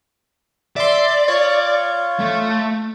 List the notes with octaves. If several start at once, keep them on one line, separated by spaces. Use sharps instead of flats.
D5 E5 C6
F4 C#5
A3